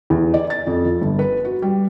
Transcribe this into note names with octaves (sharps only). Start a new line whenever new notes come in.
E2
D5
A6
F2
F3
G1
B4
F#4
G3